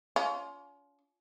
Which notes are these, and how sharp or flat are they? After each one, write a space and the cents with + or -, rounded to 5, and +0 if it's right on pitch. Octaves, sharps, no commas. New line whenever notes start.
C#4 +40 F4 +5